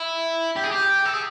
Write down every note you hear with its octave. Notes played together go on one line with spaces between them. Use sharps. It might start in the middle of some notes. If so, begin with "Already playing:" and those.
Already playing: E4
G4
G#4
G4
A4
G#4